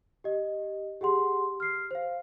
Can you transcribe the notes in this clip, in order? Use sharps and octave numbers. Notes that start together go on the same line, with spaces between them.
G4 D#5
G4 G#4 F#5 C6
F6 C7
C5 F5